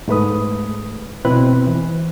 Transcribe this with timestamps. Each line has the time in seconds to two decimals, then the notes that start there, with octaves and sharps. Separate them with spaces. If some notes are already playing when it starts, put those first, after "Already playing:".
0.08 G#2 A3 B4 D#6
1.25 B2 C4 E4 B4 F#6
1.67 E3